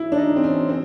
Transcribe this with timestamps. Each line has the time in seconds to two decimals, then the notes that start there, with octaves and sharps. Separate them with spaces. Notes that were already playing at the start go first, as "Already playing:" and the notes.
Already playing: E4
0.12 D4
0.17 D#4
0.36 C4
0.44 C#4
0.69 C4